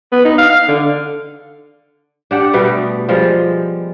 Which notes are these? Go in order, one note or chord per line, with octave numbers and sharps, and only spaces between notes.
B3
D#4
F5
F5
D3
D4 G4 F#5
B2 G3 A3 B3
F3 G3 G#3